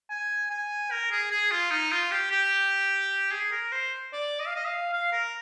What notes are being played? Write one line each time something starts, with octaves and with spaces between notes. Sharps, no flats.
G#5
G#5
A#4
G#4
G#4
F4
D#4
F4
G4
G4
G#4
A#4
C5
D5
D#5
F5
D#5
F5
F5
A#4